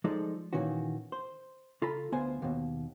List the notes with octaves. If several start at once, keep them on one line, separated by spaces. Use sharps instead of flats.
F3 G#3 D#4 A4 D5
A#2 D#3 E3 C#4 F#4
C5
C#3 F4 A4 A#5 B5
D2 B3 F4 C5 G#5
D#2 B2